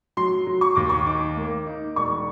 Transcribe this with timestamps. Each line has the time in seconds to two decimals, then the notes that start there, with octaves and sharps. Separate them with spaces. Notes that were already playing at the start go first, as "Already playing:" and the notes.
0.17 F#3 C6
0.47 F#3
0.61 C#6
0.75 D#2 D6
0.89 C#6
1.06 D#4 D6
1.37 A#3
1.66 D#4
1.96 E1 C#6